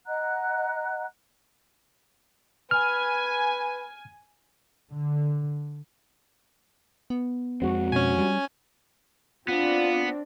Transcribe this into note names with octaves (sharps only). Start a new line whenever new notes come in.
D#5 F#5 A#5 F#6
B4 G#5 F6
D3
B3
F2 G#3 C4 F#4
B2 C#4 G#5
G3
B3 C4 D4 F4